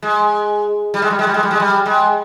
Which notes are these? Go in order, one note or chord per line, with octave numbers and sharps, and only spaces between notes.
G#3
G3
G#3
G3
G#3
G3
G#3
G3
G#3
G3
G#3